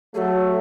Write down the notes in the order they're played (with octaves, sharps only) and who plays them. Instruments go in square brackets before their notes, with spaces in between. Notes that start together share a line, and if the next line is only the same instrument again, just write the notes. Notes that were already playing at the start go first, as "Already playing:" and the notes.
[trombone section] F#3 A3 [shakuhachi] G#4
[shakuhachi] F#4